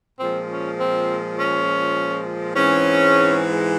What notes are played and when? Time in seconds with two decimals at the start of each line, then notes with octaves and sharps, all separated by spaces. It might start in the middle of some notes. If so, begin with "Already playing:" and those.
0.19 A#2 F3 G#3 C4
0.48 C#4
0.78 C4
1.37 C#4
2.55 G#2 E3 G#3 C4 C#4